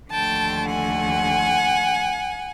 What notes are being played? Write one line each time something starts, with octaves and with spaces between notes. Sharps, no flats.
D#2 D3 F3 A3 G5 A5
F#5 G#5